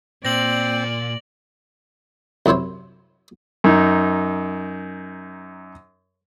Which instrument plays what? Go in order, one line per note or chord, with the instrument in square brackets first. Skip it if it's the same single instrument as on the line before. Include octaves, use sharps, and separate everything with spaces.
[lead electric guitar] A#2 [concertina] C4 C5 [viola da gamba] D5 [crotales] A#6 F#7
[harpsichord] C2 F#2 E4 C5 C#5
[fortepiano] F#2 D#4